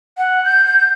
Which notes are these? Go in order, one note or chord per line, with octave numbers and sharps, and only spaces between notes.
F#5
G6